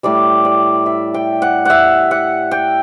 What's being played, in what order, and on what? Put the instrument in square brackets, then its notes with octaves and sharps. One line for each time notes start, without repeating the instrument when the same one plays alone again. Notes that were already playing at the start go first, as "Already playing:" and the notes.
[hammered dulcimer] A2 G3 D5
D5
E5
G5
F#5
E5 F#5
F#5
G5